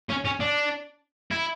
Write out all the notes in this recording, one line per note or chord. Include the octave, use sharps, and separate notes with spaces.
C#4
C#4
D4
E4